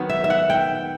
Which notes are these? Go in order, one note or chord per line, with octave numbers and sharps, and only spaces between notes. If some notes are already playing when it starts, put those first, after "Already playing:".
Already playing: D#3 F#3 B3 F#5
E5
E5
F#5
G5